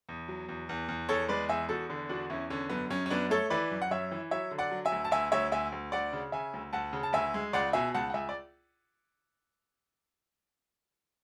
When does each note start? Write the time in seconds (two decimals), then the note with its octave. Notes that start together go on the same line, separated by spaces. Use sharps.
0.09 E2
0.28 F#3
0.49 E2
0.69 E2
0.88 E2
1.09 E2 A4 C#5
1.28 G#3 B4 D5
1.49 E2 E5 G#5
1.69 E2 F#4 A4
1.90 D3
2.09 E2 D4 F#4
2.30 E2 C#4 E4
2.50 D3 C#4
2.69 F#2 B3
2.90 F#2 C#4
3.06 C#4
3.10 F#2 B3 D4
3.30 A3 A4 C#5
3.50 E3 B4 D5
3.71 F#2
3.82 F#5
3.91 F#2 C#5 E5
4.11 E3
4.31 F#3 C#5 E5
4.51 D3
4.58 D5 F#5
4.71 F#3
4.85 E5 G#5
4.92 D2
5.05 A5
5.11 D2 E5 G#5
5.32 D2 C#5 E5
5.52 D2 E5 G#5
5.72 D2
5.92 D2 D5 F#5
6.13 C#3
6.32 C#3 E5 G#5
6.54 D2
6.73 D2 F#5 A5
6.93 C#3
7.03 A5
7.13 D2 E5 G#5
7.34 G#3
7.53 C#2 D5 F#5
7.73 B2 E5 G#5
7.94 C#2 F#5 A5
8.10 F#5
8.14 C#2 E5 G#5
8.29 D5